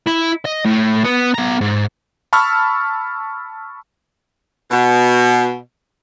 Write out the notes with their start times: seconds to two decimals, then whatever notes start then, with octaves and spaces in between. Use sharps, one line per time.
0.07 E4
0.45 D#5
0.65 A2
1.04 B3
1.34 B3 A#5
1.61 G#2
2.33 A5 B5 C#6 E6 F6
4.71 B2